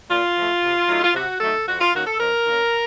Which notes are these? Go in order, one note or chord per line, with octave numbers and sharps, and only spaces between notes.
A#2 F4
F3 A3
C3
F#3 A3 D#4
F4
C3 F#4
F#3 A3 D#4 A4
F2 F#4
F4
D#3 A#3 C#4 F#4
A4
F2 A#4
D#3 A#3 C#4